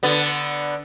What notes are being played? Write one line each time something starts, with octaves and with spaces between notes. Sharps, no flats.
D3 B3